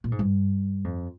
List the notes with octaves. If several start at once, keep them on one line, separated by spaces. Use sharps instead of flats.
A#2
G#2
G2
F2